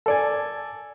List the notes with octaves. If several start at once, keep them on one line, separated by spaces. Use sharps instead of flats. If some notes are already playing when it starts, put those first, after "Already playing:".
A4 D5 G#5